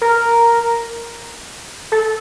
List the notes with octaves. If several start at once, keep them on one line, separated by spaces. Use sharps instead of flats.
A#4
A4